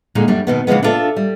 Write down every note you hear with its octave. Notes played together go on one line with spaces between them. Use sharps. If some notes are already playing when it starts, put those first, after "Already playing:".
A#2 D3 G#3 D#4
F#2 G3 D4
B2 D#3 B3
C#3 E3 F3 G#3 B3
D4 E4 F4 A4 E5
G3